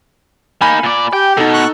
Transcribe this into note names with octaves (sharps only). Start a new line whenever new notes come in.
A#3 D#4 G#5 B5
A#2 D5
G4 G5
B2 D#4 A4
C#6 F#6